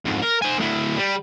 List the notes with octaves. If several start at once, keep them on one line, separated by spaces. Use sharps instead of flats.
F2 G#2
A#4
C5 G#5
D2 E4
G3